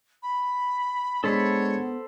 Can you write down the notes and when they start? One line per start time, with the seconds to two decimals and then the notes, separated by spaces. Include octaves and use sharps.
0.23 B5
1.24 G#3 B3 D4 G#4 A4 C5 C#5 B5